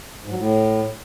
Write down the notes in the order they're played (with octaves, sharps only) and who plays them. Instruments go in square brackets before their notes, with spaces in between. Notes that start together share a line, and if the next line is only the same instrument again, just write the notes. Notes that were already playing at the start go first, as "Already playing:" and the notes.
[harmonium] G#2
F#3
A2